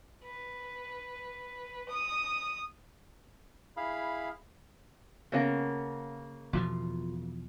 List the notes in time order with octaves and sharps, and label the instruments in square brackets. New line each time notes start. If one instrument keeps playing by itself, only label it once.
[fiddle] B4
D#6
[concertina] E4 G#4 F5 B5
[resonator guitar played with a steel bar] C#3 A#3 [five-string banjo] B3 C#4 A5
[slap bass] E2 B2 F3 [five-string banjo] F4